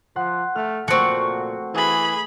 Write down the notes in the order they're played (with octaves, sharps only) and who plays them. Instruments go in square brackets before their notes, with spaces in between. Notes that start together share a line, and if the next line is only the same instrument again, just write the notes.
[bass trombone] F3 [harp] F#5 C6
[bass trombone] A3 [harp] F6
[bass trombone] A#2 [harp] A3 C#6 [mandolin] C4 F#4
[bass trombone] E3 [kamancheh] G#4 B5